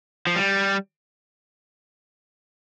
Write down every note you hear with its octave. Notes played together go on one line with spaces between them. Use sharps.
F3
G3